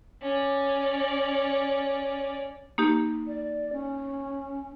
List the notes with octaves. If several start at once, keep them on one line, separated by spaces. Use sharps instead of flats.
C#4 D5
A#3 D#4 G4
D5
C#4